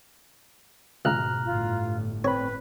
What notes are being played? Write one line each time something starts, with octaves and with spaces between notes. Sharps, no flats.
C#2 G#2 B2 A#5 F6 F#6
G1 A2 F4
C4 B4 C#5 B5